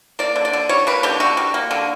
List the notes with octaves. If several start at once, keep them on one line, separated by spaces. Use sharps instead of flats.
A#3 D5
D3
D5
D3
G3 C#5
A#3 B4
D3 G4
D3 F#4
G3
A#3
D3